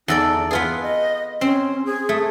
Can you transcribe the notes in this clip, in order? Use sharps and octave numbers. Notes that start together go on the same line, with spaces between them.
E2 D#4 A4 D5
B3 F4 G#4 B4
D#5
C4 C#4
G#4
A3